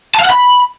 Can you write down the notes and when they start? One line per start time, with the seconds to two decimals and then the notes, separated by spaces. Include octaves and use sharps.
0.14 A5
0.20 F5
0.25 F#5
0.30 B5